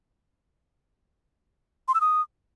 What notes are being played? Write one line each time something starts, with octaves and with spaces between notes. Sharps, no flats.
C6
E6
D#6